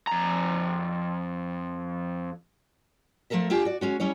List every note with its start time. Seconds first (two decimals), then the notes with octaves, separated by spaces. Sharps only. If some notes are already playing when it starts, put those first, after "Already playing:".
0.07 F2 A#5
3.30 F3 A3 A4 A#4 E5
3.50 D4 F4 G4 G#4
3.65 F#4 D5
3.81 G#3 C#4 F#4
4.00 G3 C#4 E4 C#5